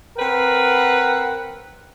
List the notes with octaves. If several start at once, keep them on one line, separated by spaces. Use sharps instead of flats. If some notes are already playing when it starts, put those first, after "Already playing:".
C4 A#4 B4 F#5